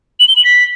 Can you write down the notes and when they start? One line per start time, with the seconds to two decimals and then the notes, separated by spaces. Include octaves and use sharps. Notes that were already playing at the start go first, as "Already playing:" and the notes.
0.20 F#7
0.28 G7
0.36 F#7
0.44 B6